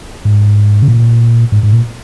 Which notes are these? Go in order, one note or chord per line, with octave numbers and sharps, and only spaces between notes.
G#2
C#3
A#2
G#2
G#2
A#2